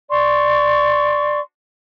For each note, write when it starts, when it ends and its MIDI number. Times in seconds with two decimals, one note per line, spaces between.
0.10 1.39 74
0.10 1.39 84
0.10 1.39 85